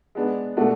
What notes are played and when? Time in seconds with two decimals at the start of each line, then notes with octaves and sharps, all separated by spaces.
0.15 G#3 B3 D4
0.57 B2 A3 D4 F#4